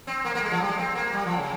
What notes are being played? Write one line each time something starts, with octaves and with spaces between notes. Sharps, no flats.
C4
A#3
A#3
G#3
F3
G3
G#3
C4
A#3
G3
F3
C#3